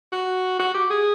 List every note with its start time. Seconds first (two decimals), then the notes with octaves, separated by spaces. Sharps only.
0.12 F#4
0.59 F#4
0.74 G4
0.90 G#4